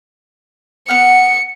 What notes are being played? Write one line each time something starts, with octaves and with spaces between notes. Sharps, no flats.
B3 F#5 F6 C#7